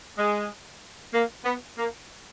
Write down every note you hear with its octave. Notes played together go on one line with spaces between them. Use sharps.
G#3
A#3
B3
A#3